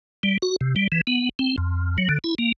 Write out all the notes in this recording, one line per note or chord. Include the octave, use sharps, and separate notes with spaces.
G3
F#4
C3
G3
E3
B3
C4
F2
F#3
D3
E4
A#3